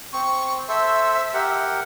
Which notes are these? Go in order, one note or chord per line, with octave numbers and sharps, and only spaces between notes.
C4 C#6
A4 C5 E5
G4 A#4 F#5